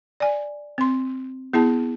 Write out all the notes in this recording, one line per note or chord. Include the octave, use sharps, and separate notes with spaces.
D5 G#5
C4 C6
B3 E4 G#4 A5